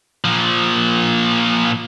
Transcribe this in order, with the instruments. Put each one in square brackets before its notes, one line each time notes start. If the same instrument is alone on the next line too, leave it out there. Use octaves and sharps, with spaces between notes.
[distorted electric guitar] A#2 F3